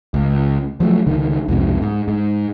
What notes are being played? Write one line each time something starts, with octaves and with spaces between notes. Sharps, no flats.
C#2
F3 F#3 G#3 A3
C#2 D3 D#3
C2 F2 G#2 B2
G#2
G#2